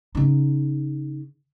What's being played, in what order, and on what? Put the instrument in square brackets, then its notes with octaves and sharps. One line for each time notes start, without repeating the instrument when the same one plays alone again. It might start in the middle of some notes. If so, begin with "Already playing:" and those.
[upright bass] C#3 D#4